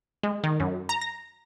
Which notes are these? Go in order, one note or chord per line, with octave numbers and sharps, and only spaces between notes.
G#3
D#3
F#2
A#5
A#6